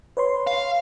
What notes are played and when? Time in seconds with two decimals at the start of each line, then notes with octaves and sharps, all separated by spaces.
0.17 B4 C#5 C6
0.47 F5